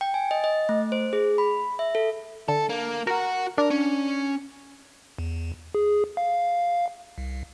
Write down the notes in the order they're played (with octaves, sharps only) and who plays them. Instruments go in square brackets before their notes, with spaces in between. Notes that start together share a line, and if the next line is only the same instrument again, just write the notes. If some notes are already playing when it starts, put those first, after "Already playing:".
[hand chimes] G5
G#5
D#5
D#5
A3
C5
G#4
B5
E5
A4
[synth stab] D3 [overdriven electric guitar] A4
[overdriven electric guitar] A#3
[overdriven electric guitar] F#4 F#5 [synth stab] A#4
[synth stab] D4 [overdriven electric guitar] A#4
[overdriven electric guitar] C#4
[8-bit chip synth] E2
G#4
F5
C2